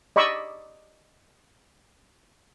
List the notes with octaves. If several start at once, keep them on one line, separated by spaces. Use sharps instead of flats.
D5 D#5 B5 C#6 D6 E6